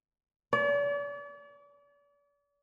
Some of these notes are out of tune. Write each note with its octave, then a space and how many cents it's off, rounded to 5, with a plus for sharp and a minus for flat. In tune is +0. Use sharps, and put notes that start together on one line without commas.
D5 -40